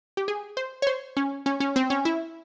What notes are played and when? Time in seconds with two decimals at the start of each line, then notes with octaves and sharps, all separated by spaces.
0.17 G4
0.28 G#4
0.57 C5
0.82 C#5
0.87 C5
1.17 C#4
1.46 C#4
1.60 C#4
1.76 C4
1.90 C#4
2.05 E4